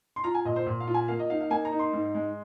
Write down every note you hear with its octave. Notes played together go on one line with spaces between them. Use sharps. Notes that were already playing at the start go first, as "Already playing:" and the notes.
C6
F4 A#5
G#5
A#2 D#5
C5
A#2
F5
F4
G#5
A#3 F5
D#5
D#4 F5
F5
A#3 G#5
A#5
D#4
C6
G#2
G#3